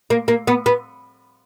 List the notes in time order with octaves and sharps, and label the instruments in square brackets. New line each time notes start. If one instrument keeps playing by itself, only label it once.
[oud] A#3
A#3
B3
B3